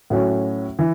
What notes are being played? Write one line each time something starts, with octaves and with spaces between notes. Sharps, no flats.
A2 F#3 C#4 F#4
E3